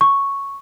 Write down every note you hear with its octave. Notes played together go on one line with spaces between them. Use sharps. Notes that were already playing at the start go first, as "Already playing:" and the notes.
C#6